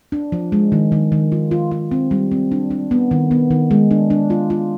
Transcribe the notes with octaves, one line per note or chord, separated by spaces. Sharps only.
D4
F3
G#3
D#3
D#3
D#3
F4
F4
F4
C4
G3
C4
D4
D4
B3
D#3
B3
D#3
G#3
D4
D4
F4
F4